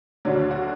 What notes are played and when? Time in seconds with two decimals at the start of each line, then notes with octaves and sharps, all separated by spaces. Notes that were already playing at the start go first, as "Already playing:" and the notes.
0.25 D2 D3 F#3 D4
0.51 F#4